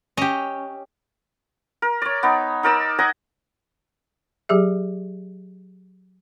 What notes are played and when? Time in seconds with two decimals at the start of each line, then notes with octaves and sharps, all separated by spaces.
0.17 C#4 G4 D#5
1.82 A#4
2.02 C#5 D5
2.23 B3 D#4
2.63 D#4 A#4 D5 E6
2.99 D#5 F#5 G#5 A#5
4.49 F#3 G4 G#4 E5